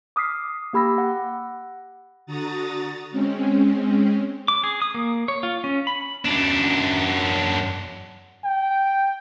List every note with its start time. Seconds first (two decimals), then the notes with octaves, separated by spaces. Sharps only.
0.16 D6 D#6 F6 B6 C7
0.73 A#3 G4 B5 E6 A#6
0.98 F#5
2.26 D3 F#4 A#5 D#6 A6
3.11 G#3 C4 C#4
4.48 D6
4.64 G#4
4.82 D#6
4.94 A#3
5.28 C#5
5.43 F4
5.64 C#4
5.87 B5
6.25 F#2 D4
8.44 G5